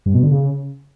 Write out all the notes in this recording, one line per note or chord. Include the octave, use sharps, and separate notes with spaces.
G2
B2
D3
C#3